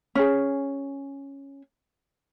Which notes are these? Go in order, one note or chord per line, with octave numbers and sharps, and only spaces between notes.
C#4 G#4